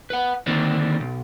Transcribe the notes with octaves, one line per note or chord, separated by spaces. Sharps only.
B4 F#5
D3 D#3 A#3 C4 D4
B1